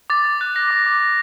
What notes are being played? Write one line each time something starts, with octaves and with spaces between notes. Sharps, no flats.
D6 A6
D6
F#6
F#6 A#6
D6
D6
D6